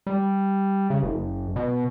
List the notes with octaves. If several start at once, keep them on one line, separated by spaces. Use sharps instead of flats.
G3
C#3
F#1
B2